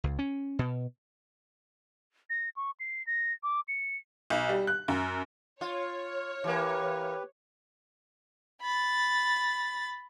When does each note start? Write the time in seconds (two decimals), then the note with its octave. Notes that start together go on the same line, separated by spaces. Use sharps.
0.04 C#2
0.19 C#4
0.59 B2
2.30 A#6
2.57 C#6
2.80 C7
3.07 A#6
3.43 D6
3.68 C#7
4.30 B1
4.49 G3
4.67 F#6
4.88 F#2
5.61 F4 C#5
6.44 E3 A#3 G4 B4
8.62 B5 A6